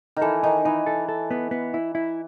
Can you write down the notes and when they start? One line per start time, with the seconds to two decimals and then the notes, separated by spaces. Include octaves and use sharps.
0.16 D#3
0.22 E3 A4
0.43 D#3 D#4
0.65 E3 D#4
0.86 A4
1.09 A4
1.31 B3
1.51 B3
1.74 E4
1.95 E4